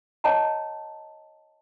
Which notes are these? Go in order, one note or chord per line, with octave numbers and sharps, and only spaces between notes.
C#5 D#5 G5 A5 A#5